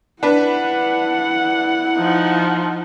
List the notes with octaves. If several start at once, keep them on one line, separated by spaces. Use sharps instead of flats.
D4 E4 B4 F#5
F3 D#4